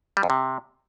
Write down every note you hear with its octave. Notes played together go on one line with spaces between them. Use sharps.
G3
F2
C3